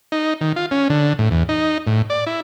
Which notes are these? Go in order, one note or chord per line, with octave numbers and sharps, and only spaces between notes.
D#4
D#3
F4
C#4
D3
A2
E2
D#4
A2
D5
E4